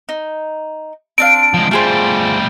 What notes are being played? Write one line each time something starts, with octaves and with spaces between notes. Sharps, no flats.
D#4
C4 D4 F5 D7
F3 G#3
G3 A3 F4 G#4 C5